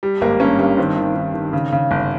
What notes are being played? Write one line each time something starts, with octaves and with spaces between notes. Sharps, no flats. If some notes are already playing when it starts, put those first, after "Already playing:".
G3
G#1 A#3
G2 A#3 C#4
G2 A#3
D#3 C4
D#3
D#3
D#3
C#3
C#3
G1